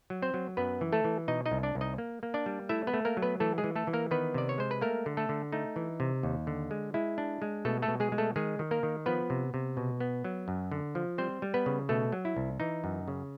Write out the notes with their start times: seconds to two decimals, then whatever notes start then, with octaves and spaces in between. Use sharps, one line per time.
0.10 F#3
0.22 C4 C5
0.34 F#3
0.57 F#2 B3 B4
0.81 E3
0.92 A3 A4
1.04 E3
1.28 B2 D#4 D#5
1.46 D#4 D#5
1.51 C2
1.63 D4 D5
1.75 C2
1.81 D#4 D#5
1.98 A#3
2.23 A#3
2.34 D4 D5
2.46 G3
2.69 A3 E4 E5
2.87 B3 B4
2.94 A3
3.05 A#3 A#4
3.17 F#3
3.22 B3 B4
3.40 E3 A3 A4
3.58 G#3 G#4
3.64 E3
3.76 A3 A4
3.87 E3
3.93 A#3 A#4
4.11 D#3 B3 B4
4.34 C3 D5
4.49 C#5
4.58 G#3 C5
4.71 B4
4.81 A3 A#3 A#4
5.06 D3
5.17 A3 A4
5.29 D3
5.52 A3 D#4
5.76 E3
6.00 C3
6.23 D#2
6.47 D3
6.71 G#3
6.94 G#3 E4
7.18 D4
7.42 G#3
7.65 B2 A3 A4
7.82 A3 A4
7.88 B2
8.00 G#3 G#4
8.12 G#3
8.18 A3 A4
8.36 D#3 G#3 G#4
8.59 D#3
8.71 A#3 A#4
8.83 D#3
9.06 F3 B3 B4
9.30 C3
9.54 C3
9.77 B2
10.00 B3
10.24 F#3
10.48 F#2
10.72 D3
10.95 F3
11.18 G3 C4 C5
11.42 G3
11.54 B3 B4
11.66 C#3
11.89 B2 A3 A4
12.12 F#3
12.25 E4
12.36 C2
12.60 E3 D#4
12.84 F#2
13.08 C#3